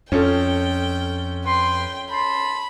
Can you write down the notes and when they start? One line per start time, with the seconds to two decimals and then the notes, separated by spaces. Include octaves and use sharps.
0.12 F2 C#4 F4 A4 G5
1.45 B4 G5 C6
2.10 A5 B5 C6